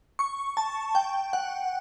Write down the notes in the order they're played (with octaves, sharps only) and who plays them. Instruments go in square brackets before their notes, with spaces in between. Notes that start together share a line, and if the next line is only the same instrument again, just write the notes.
[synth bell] C#6
A5
G5
F#5